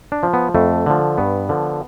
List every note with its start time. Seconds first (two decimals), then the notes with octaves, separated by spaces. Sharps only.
0.12 D4
0.23 F3
0.34 B3
0.55 F2 A3
0.86 D3 F3
1.18 G2 B3
1.49 D3 F3